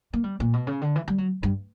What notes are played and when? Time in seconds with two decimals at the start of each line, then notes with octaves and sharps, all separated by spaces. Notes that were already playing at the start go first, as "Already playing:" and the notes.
0.13 A#3
0.24 G3
0.40 A#2
0.53 B2
0.67 C#3
0.81 D3
0.96 E3
1.08 G3
1.18 F#3
1.43 G2